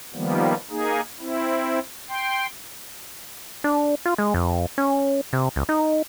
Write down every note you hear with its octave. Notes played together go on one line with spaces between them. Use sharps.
D#3 F3 G3 A#3 B3
A#3 D#4 G#4
C4 E4
G5 C6
D4
F4
G#3
F2
C#4
C3
C#2
D#4